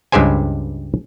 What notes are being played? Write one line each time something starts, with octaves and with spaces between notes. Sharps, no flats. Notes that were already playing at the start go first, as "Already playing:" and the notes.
C#2 G2 G#3 G4 C5 G#5